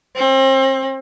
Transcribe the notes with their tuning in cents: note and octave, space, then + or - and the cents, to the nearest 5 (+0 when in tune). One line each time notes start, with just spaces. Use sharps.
C4 +35